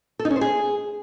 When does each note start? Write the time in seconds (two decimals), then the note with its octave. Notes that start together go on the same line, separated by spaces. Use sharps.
0.19 A4
0.25 D#4
0.30 C#4
0.36 C5
0.41 G#4